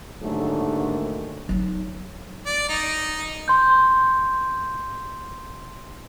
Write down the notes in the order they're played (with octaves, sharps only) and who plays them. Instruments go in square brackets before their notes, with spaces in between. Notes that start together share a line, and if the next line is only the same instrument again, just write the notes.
[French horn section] D#2 G#2 D3 D#3 F#3 A3
[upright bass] F#3 D#4
[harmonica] D5
D#4
[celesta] C6 G6